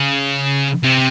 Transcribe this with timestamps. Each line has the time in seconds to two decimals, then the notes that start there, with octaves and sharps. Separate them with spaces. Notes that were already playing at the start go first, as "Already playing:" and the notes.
Already playing: C#3
0.83 C3